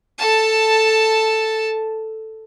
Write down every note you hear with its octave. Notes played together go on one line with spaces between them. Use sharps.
A4 A5